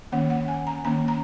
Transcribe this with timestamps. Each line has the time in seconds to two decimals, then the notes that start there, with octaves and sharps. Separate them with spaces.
0.12 D#3 A#3 C#4 F#5
0.30 F#5
0.48 G#5
0.67 A#5
0.84 D#3 A#3 C#4 A#5
1.08 A#5